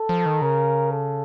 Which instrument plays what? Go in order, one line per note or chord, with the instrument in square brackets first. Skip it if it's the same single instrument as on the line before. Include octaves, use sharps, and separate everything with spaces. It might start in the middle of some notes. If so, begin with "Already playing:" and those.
Already playing: [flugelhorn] A4
[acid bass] F3
D#3
[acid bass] C#3 [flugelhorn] A#4
[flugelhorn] A4